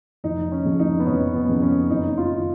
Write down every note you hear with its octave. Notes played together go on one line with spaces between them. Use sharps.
F1 D#4
C#4
F2 C#3
D#4
B3
F1 C#4
B3
F2 C#3
C#4
F#1 D#4
F4
D#3